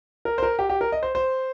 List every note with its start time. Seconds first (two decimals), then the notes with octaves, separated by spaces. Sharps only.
0.25 A#4
0.38 C5
0.43 A#4
0.59 G4
0.69 G4
0.81 A#4
0.92 D#5
1.03 C5
1.15 C5